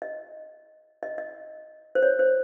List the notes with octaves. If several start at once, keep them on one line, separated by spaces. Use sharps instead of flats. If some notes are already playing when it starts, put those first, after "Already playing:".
D#5
D#5
D#5
C5
C#5
C5